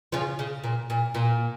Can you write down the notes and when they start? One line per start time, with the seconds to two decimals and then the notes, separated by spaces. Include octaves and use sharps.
0.12 C#3 F3
0.39 C#3
0.64 A#2
0.90 A#2
1.15 A#2